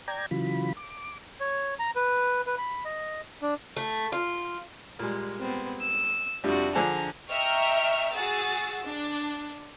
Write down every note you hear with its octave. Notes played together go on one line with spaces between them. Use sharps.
D5 G5 A#5 G#6
C#3 E3 F#3 F4 B5
D6
C#5
A#5
B4
B4
B5
D#5
D4
A3
F4
A#2 G3 G#3
B3 C4
E6
F2 C3 G3 D4 F#4
D3 F3 G#4 A#5
D#5 E5 G5 A#5 C#6 F6
F#4 G#4 E6 A6
D4